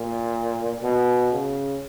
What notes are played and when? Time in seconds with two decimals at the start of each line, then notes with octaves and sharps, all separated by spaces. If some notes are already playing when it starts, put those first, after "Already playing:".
Already playing: A#2
0.83 B2
1.32 C#3